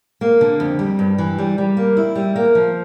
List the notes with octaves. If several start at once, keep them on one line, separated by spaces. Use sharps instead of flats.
A#3
D3
F2
G3
G2
E3
G3
G3
A#3
E4
G3
A#3
F3